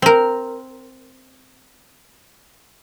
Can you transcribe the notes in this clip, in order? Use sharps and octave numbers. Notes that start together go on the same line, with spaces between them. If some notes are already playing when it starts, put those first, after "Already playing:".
C4 A#4